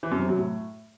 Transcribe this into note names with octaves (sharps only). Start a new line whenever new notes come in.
E3
F#2
C3
F#3
A2